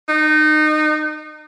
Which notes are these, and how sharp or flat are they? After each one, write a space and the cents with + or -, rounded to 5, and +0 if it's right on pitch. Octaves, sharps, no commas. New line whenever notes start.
D#4 -25